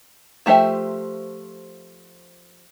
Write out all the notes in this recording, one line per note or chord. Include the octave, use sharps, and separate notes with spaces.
F3 A3 G4 C5 E5